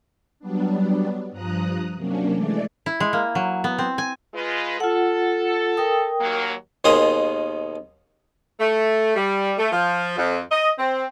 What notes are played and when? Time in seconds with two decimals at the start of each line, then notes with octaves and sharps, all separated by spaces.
0.40 F#3 G3 B3 D4
1.31 G2 F3 A#5 D#6 F#6
1.96 C3 F#3 A#3 C#4 D4
2.33 E3 G#3 A3 D5
2.86 E4
3.00 G#3
3.13 A#3
3.35 F#3
3.64 B3
3.78 C4
3.98 G#5
4.35 G#3 F4 B4
4.80 F4 A4 F#5
5.77 A#4 G5 D#6
6.21 D#2 F#3 A#3
6.84 D#2 B2 D#3 G#4 C5 D#6
8.60 A3
9.16 G3
9.58 A3
9.72 F3
10.18 F2
10.52 D#5
10.79 C4